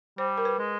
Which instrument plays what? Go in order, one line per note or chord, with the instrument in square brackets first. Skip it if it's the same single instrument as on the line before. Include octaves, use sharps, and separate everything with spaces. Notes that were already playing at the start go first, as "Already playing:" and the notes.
[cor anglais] G3 [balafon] C5
[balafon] A#4
B4
[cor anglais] G#3